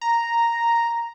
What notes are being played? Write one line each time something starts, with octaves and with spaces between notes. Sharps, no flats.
A#5